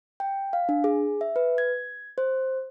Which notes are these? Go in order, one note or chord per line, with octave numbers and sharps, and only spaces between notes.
G5
F5
D4
G#4
E5
B4
G#6
C5